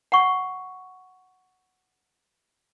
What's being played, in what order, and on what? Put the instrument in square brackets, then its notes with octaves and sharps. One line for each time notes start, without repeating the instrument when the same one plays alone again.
[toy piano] F#5 C#6